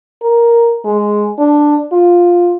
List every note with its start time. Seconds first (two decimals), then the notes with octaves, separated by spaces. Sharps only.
0.22 A#4
0.85 G#3
1.39 D4
1.92 F4